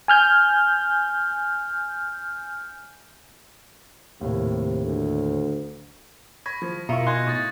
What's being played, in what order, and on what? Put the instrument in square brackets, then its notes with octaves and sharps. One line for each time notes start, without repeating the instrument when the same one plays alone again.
[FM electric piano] G#5 F6 G6
[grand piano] D#2 A2 [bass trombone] C3
[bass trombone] D2
[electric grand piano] B5 G#6 A#6 [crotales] C#6
[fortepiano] F3
[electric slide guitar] B2 F4 [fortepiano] E4 C#6 [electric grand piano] A#4 A#5 [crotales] C#7
[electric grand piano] D#4 D#5 G#5 [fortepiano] C6 [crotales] F#6 G#6 A#6
[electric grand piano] A2 [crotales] C#6 D#6 A6